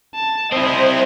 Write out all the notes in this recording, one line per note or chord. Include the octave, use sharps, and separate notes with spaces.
A5
C4 E4 C5 D#5 D#6